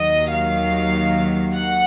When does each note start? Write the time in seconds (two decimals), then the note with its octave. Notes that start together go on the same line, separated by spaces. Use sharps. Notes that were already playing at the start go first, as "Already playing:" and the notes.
Already playing: D#2 D#3 F#3 D#5
0.31 F5
1.55 F#5